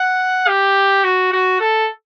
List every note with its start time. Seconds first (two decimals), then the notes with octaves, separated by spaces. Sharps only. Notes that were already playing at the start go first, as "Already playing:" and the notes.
Already playing: F#5
0.48 G4
1.04 F#4
1.32 F#4
1.60 A4